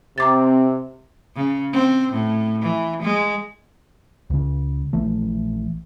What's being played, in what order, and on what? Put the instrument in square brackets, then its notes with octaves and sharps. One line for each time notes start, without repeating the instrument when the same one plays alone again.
[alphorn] C3 [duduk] C4 [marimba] A#5 D6 A6
[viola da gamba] C#3
C4
A2
E3
G#3
[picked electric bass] C#2 C#3
A#1 E3 A3